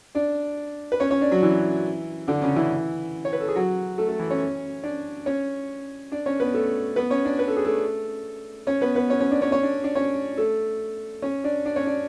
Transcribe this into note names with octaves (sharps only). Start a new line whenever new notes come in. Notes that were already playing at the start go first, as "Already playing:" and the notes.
D4 D5
B4
C#4 C#5
C#4 C#5
D4 D5
F#3 F#4
E3 E4
D3 D4
C#3 C#4
E3 E4
C#5
B4
A4
G#4
F#3 F#4
A3 A4
A3 A4
E3 E4
C#4 C#5
D4 D5
C#4 C#5
D4 D5
C#4 C#5
B3 B4
A3 A4
B3 B4
C#4 C#5
D4 D5
B4
A4
G#4
A3 A4
C#4 C#5
B3 B4
B3 B4
C#4 C#5
C#4 C#5
D4 D5
C#4 C#5
C#4 C#5
D4 D5
D4 D5
C#4 C#5
A3 A4
C#4 C#5
D4 D5
D4 D5
C#4 C#5
D4 D5